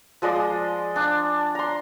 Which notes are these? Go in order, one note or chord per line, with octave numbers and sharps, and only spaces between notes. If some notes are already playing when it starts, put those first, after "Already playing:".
F3 G#3 D5 D#5
D4
A#5 C6